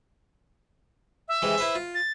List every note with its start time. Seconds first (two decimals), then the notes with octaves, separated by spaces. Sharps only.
1.28 E5
1.42 C3 E3 G#3
1.58 E4 B4 C5
1.75 F4
1.95 A6